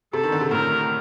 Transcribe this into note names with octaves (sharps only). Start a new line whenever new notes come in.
C3 A4
D#3
D3
C3
A2 A#4